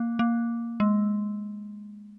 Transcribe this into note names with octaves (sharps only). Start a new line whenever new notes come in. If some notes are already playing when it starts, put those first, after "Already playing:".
Already playing: A#3
A#3
G#3